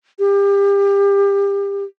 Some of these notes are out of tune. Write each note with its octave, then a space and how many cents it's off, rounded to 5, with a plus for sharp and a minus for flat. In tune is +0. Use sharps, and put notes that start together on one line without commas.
G4 +30